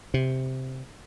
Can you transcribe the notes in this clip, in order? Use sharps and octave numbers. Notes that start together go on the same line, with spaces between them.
C3